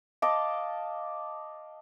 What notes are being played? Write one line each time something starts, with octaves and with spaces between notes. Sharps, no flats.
D#5 F5 A5 D6